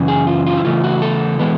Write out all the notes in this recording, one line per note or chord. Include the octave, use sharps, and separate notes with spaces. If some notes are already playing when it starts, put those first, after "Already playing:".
Already playing: F#2 C#3 E3
G#4
F4
F4
E4
C#3 E3 A3 F4
F#4
A4
E3 G#3 B3